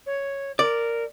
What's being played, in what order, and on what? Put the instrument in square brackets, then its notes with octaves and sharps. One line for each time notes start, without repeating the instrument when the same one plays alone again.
[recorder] C#5
[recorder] A#4 [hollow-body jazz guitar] D5